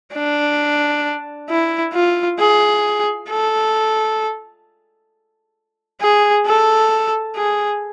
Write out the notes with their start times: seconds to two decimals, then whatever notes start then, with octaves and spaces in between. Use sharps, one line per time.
0.13 D4
1.49 E4
1.93 F4
2.39 G#4
3.29 A4
6.01 G#4
6.46 A4
7.36 G#4